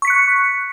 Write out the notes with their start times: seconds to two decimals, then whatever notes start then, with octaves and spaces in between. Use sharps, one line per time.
0.02 C#6
0.05 B6
0.07 C#7
0.10 F#6